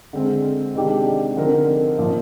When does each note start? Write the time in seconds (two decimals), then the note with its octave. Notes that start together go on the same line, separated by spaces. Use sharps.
0.13 D3 G#3 C4
0.75 C3 D#3 G#3 D4 G4
1.37 D3 F3 C4 D#4 A#4
1.98 A#2 F3 A#3